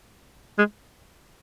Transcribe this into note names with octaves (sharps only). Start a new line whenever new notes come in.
G#3